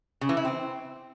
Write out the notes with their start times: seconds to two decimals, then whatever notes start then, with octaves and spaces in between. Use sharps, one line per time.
0.21 C#3
0.29 E3
0.37 E4
0.45 C4